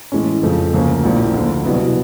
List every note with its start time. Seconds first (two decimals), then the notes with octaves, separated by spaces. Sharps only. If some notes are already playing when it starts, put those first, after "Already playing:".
0.12 A2 E3 G#3 C#4
0.43 F2 C#3 F3 A3
0.73 D2 C#3 F3 A#3 C#4
1.04 A#1 A2 F3 A#3
1.34 D2 D3 F3
1.64 C2 B2 F#3 B3 E4